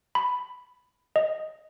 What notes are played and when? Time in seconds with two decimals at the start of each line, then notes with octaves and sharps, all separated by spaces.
0.15 B5
1.16 D#5